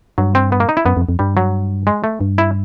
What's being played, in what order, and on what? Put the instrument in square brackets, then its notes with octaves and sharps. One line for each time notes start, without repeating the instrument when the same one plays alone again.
[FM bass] G2 [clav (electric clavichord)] F#3
[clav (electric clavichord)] C4
B3
A#3
D#4
E4
[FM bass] F#2 [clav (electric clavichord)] B3
[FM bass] F2
F2
[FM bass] G2 [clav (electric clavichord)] G3
[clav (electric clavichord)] F#3
G#3
A3
[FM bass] G2
[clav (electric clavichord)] E4